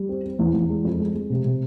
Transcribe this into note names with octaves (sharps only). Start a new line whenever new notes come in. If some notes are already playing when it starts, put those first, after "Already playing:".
Already playing: G3
C4
C4
E2
E2
G#3
F2
G#3
G#3
C3
C3